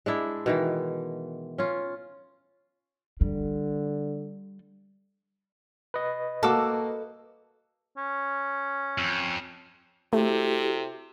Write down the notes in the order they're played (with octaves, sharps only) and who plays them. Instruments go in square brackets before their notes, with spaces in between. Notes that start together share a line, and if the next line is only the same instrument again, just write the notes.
[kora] G#3 D4 E4
B2 D#3 E3
C#4 F4
[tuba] D3 [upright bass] G3
[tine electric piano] B4 D#5
[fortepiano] A#3 F#4 D6 [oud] A4
[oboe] C#4
[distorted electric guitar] F2
[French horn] C3 [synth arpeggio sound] A3 [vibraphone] E4 F#4 A4 [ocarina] G4